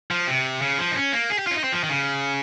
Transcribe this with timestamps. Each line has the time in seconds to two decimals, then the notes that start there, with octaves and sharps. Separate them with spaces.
0.11 F3
0.27 C3
0.62 C#3
0.79 F3
0.91 D#4
0.95 C#4
1.13 A#3
1.30 G#4
1.38 G4
1.47 F4
1.51 C#4
1.55 D#4
1.64 C4
1.72 F3
1.84 D#3
1.89 C#3